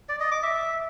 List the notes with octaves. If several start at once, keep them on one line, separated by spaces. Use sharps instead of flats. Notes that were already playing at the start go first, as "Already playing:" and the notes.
D5
D#5
D6
E5